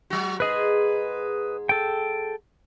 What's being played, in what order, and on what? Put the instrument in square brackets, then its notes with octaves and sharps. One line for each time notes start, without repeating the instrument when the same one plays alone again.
[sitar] F#3 F#4
[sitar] G#2 G#4 [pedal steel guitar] B4 D#5
[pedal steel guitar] A4 G5